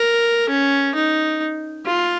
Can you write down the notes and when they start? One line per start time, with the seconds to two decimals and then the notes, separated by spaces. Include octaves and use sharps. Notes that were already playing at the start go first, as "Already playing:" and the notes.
Already playing: A#4
0.50 C#4
0.95 D#4
1.86 F4